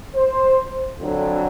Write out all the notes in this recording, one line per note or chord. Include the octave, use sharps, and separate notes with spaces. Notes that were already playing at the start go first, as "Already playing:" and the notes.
C5
F2 D3 F#3